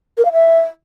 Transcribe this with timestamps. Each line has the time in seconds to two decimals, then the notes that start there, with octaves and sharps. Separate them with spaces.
0.18 A#4
0.25 F5
0.33 E5